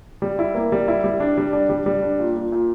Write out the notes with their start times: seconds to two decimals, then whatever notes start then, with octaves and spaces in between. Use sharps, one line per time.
0.22 G3
0.39 E4
0.55 A#3
0.72 G3
0.88 E4
1.04 G3
1.20 D4
1.37 G3
1.53 D4
1.69 G3
1.86 G3
2.03 D4
2.19 A#2
2.36 A#2
2.52 A#2